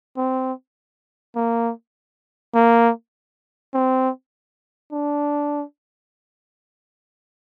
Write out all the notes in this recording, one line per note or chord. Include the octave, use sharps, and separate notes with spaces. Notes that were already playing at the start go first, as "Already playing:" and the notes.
C4
A#3
A#3
C4
D4